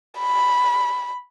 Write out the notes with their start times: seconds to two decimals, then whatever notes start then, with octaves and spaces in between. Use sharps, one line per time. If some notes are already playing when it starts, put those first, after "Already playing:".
0.19 B5